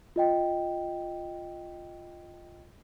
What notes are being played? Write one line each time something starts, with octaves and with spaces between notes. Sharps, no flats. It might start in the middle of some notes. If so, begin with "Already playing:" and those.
F4 D#5 G5